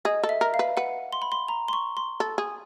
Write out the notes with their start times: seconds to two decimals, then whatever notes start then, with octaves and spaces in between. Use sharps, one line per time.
0.05 G#4 D#5
0.23 A4
0.29 E5
0.41 A#4
0.54 F5
0.59 B4
0.77 B4 F#5
1.13 C6
1.22 B5
1.32 C6
1.48 A#5
1.68 C6
1.73 C#6
1.97 C6
2.20 A4
2.38 G#4